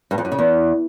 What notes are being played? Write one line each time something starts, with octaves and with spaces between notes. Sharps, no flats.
G2
F2
F#2
C#3
E2